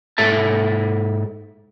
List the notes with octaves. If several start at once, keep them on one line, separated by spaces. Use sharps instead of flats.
G#2 A4 E5 A5